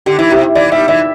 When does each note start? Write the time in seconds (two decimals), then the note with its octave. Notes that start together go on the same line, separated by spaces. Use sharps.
0.06 D3 G4
0.18 E3 E4
0.31 C3 G4
0.55 E3 D5
0.72 G3 E5
0.88 E3 E5